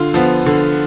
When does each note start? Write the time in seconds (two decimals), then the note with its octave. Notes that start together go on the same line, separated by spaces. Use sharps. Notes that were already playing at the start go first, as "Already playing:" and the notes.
Already playing: D3 F4
0.14 F3 B3
0.46 D3